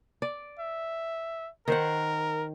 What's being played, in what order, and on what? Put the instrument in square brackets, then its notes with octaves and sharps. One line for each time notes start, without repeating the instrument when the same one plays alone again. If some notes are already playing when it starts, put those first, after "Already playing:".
[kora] D5
[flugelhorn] E5
[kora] D#3 C5 F#5 [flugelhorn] A#4